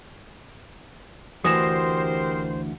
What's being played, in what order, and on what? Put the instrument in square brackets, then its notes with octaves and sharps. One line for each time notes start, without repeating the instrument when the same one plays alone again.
[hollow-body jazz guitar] D2 E3 [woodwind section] G4 A#4 C5 [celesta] D#6 A#6 E7